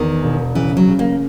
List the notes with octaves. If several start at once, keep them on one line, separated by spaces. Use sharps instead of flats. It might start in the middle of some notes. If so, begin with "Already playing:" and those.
Already playing: E2 D#3
E1
C#3 E3
F#3
C#3
A#3